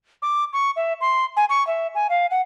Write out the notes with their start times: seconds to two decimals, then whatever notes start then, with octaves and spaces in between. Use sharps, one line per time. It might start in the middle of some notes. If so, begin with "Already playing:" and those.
0.22 D6
0.53 C#6
0.76 E5
1.01 C6
1.36 G#5
1.49 C#6
1.67 E5
1.95 G#5
2.10 F5
2.31 F#5